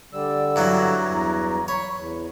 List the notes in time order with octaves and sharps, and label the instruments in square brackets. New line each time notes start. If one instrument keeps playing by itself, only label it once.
[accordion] D3 G3 E6 [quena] D5
[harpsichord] G2 E3 F#3 [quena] A#5
[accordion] E2
[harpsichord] C#5 [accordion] B5 C#6
[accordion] E2